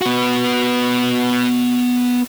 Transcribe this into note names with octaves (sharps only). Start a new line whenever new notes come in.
B3 F#4